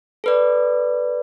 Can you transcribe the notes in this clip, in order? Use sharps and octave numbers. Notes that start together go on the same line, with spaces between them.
A4 B4 D5